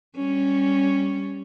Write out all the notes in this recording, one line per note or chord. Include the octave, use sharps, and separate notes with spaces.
G3 C#4